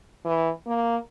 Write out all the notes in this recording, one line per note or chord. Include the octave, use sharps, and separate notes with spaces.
E3
A#3